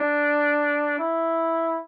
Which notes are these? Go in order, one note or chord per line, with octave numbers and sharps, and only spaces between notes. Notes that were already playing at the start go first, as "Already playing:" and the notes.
Already playing: D4
E4